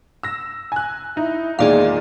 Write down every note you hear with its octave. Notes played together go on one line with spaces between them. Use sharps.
E6 A#6
G#5 F#6
D#4 E4
E2 A#2 D#3 G#3 G#4 D5 F5